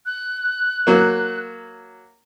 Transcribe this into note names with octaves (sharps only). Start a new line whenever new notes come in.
F#6
F#3 A#3